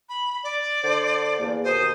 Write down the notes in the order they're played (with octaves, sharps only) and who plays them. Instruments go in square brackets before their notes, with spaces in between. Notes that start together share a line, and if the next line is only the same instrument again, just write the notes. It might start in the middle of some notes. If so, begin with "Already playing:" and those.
[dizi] B5
D5
[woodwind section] D3 C5
E2 A#3
[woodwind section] D#2 B2 D#6 [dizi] C5